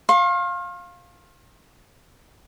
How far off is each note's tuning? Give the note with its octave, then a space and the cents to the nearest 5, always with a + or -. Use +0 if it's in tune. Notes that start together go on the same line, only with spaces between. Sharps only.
F5 +10 C6 +45